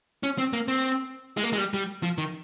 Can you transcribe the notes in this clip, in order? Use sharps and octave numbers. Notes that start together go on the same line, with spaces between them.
C#4
C4
A#3
C4
G#3
A#3
G#3
G3
G3
F3
D#3